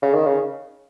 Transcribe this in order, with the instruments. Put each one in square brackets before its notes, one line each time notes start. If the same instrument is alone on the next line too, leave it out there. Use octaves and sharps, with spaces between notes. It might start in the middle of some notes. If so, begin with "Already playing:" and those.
[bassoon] C#3
D#3
C#3